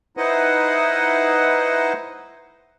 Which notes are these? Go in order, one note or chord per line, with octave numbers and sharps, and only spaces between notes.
D#4 E4 B4 C5 D#5 F#5